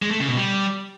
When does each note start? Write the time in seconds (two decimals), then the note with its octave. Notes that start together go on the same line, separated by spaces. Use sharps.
0.02 G#3
0.11 A3
0.20 C#3
0.28 B2
0.37 G3